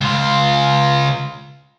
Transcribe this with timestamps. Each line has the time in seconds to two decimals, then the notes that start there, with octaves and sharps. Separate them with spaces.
0.01 C#2 F4